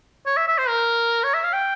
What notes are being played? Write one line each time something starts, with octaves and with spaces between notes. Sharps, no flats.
C#5
E5
E5
C5
A#4
C#5
E5
F5
G5